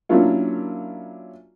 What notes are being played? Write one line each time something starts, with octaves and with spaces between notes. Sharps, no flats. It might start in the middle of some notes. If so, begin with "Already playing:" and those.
F#3 A#3 C#4 D4 E4 F4